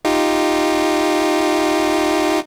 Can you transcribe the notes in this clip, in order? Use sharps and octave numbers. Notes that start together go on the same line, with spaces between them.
D#4 F4 G4